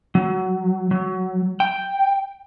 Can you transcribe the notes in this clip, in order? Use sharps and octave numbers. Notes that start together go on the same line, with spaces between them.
F#3
F#3
G5